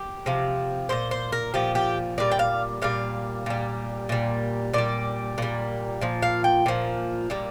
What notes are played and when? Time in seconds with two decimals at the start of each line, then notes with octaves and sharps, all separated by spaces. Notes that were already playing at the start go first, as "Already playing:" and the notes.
Already playing: G4
0.26 C3 F3
0.89 A#2 F3 C5
1.11 C5
1.32 A#4
1.54 A#2 F3 G4
1.75 G4
2.18 A#2 G3 D5
2.31 G5
2.39 F5
2.82 A#2 G3 F5
3.46 A#2 G3
4.09 A#2 G3
4.73 A#2 G3 D5
5.38 A#2 G3
6.01 A#2 F3
6.22 F5
6.44 G5
6.66 A#2 F3
7.30 A#2 G3